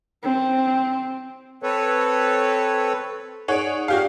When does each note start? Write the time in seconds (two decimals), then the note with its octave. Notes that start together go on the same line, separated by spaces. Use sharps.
0.23 C4
1.63 C4 A4 B4 C#5
3.48 D#4 G#4 C#5 D5 F#5
3.88 F#4 G4 F5